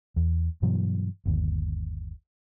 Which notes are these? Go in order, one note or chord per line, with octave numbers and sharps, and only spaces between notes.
E2
G2 B2 E3 F#3
G1 D#2